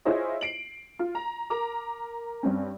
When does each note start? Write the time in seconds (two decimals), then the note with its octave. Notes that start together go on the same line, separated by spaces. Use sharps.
0.05 E4 F4 G#4 C5 C#5 D#5
0.41 C7 D7 F#7
0.99 F4
1.15 A#5
1.50 A#4 A#5 D6
2.43 G2 C4 C#4